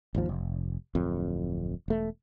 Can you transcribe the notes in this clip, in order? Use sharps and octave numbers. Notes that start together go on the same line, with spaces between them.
G#1 D#2 F3
F1
D1 F2
E1 A3